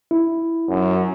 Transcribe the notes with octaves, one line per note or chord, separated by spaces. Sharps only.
E4
F#2